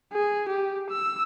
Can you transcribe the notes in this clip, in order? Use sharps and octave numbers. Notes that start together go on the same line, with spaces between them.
G#4
G4
E6